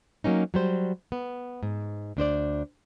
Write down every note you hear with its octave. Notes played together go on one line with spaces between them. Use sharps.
F#3 A#3 C#4 D#4
F#3 G3 C5
B3
G#2
D2 D4 C5 D5